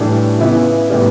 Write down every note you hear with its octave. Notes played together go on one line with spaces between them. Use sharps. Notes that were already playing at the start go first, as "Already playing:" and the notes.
Already playing: A2 E3 G3 D4
C#3 E3 B3 E4
A2 E3 G3 B3